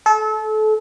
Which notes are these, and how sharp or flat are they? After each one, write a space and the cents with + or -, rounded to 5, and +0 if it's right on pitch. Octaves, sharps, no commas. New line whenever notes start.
A4 -30